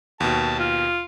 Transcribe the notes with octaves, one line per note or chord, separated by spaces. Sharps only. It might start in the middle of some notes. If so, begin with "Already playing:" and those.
D#2 B2 A5
F4